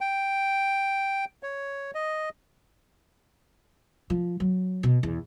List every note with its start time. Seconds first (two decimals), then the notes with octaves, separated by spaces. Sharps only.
0.01 G5
1.43 C#5
1.95 D#5
4.10 F3
4.40 F#3
4.83 B2
5.03 E2